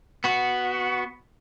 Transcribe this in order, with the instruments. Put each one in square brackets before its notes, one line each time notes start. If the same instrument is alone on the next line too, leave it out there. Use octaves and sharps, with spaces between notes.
[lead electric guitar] B3 F#4